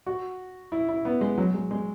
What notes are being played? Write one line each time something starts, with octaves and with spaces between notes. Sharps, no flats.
F#4
E4
E4
B3
G#3
F#3
G#3
G#3